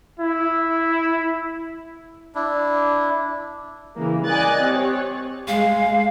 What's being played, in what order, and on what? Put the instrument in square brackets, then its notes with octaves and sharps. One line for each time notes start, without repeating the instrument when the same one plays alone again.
[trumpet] E4
[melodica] D4 E4
[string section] C#3 E3 A#3
D5 D#5 G#5 F#6 A6
C4 G4 C#5
[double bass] G#3 [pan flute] F5